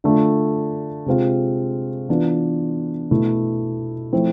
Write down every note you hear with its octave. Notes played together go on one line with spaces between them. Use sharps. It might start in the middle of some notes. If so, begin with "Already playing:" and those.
D3 A3 D4 F4
C3 G#3 C4 F4
E3 B3 D4 F4
B2 A3 E4
F3 A3 C4 E4